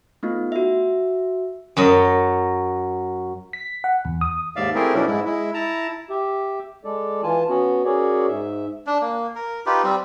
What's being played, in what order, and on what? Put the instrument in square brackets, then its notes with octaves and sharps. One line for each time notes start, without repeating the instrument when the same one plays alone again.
[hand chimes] A3 B3 D#4 F4
F#4 E5
[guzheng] F#2 F#3 D#5
[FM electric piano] B6
F#5
E2
D#6
[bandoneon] D#2 G#2 D5 E5 F5
A3 C4 E4 G4 G#4 A#4
F2 B2 F#3 C#4 D4 E4
G#2 G#3 E4
G#3 E4
E4 A5 A#5
[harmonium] G4 E5
G#3 A4 D5
E3 F4 G#5 A5
B3 C#4 F#4
C#4 F#4 G#4 A#4 C#5 D5
G#2 E5
[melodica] D4
A#3
A#4
D#4 F4 G4 B4
G3 C4